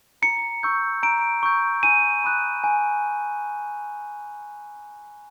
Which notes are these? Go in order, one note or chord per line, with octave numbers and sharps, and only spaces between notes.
A#5 C#7
C#6 E6 G6
A#5 D7
C#6 E6 G6
G#5 D#7
B5 D#6 F#6
G#5